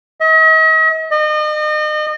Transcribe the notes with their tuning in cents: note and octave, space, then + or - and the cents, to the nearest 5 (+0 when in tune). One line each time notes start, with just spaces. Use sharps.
D#5 +45
D#5 -35